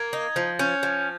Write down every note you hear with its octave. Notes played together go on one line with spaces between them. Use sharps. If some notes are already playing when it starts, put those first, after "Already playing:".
Already playing: A#3 G#6
D#4
F3
C#4 G6
F3